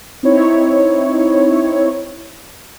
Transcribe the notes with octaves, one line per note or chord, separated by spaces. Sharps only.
C4 D#4 E4 C#5